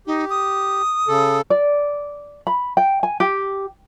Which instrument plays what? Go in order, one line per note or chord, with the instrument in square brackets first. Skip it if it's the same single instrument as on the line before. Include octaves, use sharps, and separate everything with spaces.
[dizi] D#4 [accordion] G4
[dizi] D#6
[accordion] C#3 A4
[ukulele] D5
B5
G5
G#5
G4